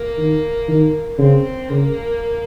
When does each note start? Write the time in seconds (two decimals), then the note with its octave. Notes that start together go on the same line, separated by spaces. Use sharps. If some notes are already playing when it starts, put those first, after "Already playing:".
Already playing: A#3
0.18 D#3
0.68 D#3
1.18 C#3 C4
1.69 C#3 A#3